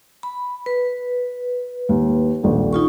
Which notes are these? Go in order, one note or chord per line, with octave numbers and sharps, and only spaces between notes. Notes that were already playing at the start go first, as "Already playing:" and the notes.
B5
B4
D#2
D#1 A#1
D#4 F4 C#6